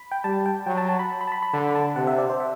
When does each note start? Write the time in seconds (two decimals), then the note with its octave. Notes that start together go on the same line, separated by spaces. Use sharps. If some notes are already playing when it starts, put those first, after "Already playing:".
Already playing: B5
0.12 G5
0.24 G3 A5
0.46 G5
0.66 F#3 G5
0.78 A5
0.89 A5
0.99 B5
1.21 B5
1.27 A5
1.32 B5
1.43 B5
1.53 D3 A5
1.75 A5
1.96 C3 F#5
2.07 E5
2.18 D5
2.30 C5
2.40 E5